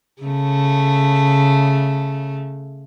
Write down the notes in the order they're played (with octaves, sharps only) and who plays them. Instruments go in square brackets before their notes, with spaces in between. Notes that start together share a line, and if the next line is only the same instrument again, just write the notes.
[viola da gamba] C#3 A3